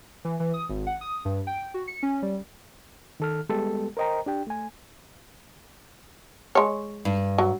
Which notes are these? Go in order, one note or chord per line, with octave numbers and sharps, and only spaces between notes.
E3
E3
D#6
G#1
F#5
D#6
G2
G5
F#4
C#7
C#4
G3
D#3 A4 F6
G3 G#3 B3 G4 A4
A#4 C5 D#5 G5 A#5
D4 G4 G5
A3 G#5
G#3 C#5
G2
F#3